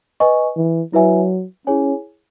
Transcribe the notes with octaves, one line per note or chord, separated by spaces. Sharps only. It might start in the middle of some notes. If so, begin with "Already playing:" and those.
B4 D#5 G#5 C#6
E3
F#3 E4 B4 E5 G#5
C#4 E4 G#4 C#5 G#5